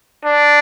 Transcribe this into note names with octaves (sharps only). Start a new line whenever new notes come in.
D4